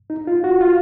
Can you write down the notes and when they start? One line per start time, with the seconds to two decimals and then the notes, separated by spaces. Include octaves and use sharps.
0.10 D#4
0.27 F4
0.44 F#4
0.61 F4